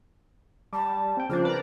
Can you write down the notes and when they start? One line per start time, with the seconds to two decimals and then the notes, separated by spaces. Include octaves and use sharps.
0.73 G3 A5
1.17 C4 G5
1.30 C#3 F3 A#3 D4 F4 C5
1.45 A#4 B4 D5 A#5